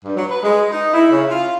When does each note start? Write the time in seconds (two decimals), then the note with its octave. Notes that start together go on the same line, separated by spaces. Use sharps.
0.05 G2
0.17 F#3
0.30 B4
0.43 G#3
0.72 D#4
0.94 E4
1.11 C#3
1.30 F4